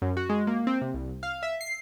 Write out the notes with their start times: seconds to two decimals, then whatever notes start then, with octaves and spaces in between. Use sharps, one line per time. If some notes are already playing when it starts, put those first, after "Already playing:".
0.02 F#2
0.17 F#4
0.29 G#3
0.47 A#3
0.67 C4
0.82 C3
0.94 C2
1.23 F5
1.43 E5
1.61 C7